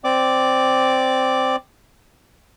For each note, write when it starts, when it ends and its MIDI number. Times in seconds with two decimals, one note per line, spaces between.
0.04 1.56 60
0.04 1.56 74
0.04 1.56 86